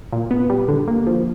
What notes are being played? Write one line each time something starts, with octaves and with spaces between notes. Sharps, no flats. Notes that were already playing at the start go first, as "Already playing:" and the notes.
A#2
B3
G3
D3
A#3
F3